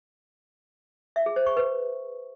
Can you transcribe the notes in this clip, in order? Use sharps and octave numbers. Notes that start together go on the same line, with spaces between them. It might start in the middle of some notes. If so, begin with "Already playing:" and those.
E5
G#4
C5
C#6
B4